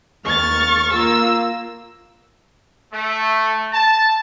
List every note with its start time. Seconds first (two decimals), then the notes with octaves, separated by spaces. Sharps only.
0.25 D#2 C#6 F6 A6
0.93 A#3 F4 E6
2.93 A3
3.73 A5